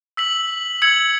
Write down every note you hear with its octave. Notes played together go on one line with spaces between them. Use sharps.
E6 B6 F#7
E6 G#6 C#7 F#7